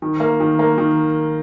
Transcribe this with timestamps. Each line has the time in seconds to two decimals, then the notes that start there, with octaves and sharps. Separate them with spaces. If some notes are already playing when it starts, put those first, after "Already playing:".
0.02 D#3
0.20 A#3
0.40 D#3
0.59 A#3
0.78 D#3